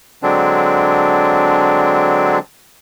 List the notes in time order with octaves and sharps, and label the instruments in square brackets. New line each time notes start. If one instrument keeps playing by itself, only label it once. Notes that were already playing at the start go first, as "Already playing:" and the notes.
[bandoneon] D3 F#3 G#3 C4 D4